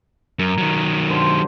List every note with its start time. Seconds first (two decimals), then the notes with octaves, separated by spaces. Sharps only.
0.39 F#2 A#4
0.58 D#3 F#3
1.10 D3 G4 C5